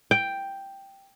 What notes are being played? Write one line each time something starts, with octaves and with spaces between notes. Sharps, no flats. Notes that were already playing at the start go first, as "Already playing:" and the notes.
G5